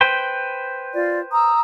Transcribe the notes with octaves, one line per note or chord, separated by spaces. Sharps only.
B4 C5 G5
F4 D5
A#5 D#6 E6